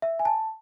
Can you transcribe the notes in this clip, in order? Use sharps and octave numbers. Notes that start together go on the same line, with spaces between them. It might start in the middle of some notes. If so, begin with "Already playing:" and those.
E5
G#5
A5